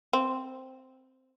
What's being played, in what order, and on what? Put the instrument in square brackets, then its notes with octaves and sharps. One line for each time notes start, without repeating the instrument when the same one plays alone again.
[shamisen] C4